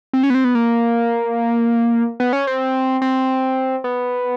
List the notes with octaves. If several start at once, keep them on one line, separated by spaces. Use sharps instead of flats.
C4
C#4
B3
C4
B3
A#3
B3
C#4
C4
C4
B3